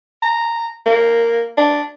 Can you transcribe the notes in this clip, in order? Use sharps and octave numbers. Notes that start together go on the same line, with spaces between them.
A#5
A#3
D4